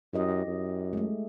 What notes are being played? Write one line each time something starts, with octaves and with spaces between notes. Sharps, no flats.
F#2 E4 G4 D#5
F#2
G#3 A3